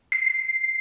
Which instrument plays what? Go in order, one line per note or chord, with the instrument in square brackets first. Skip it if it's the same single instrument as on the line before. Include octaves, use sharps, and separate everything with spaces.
[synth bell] C7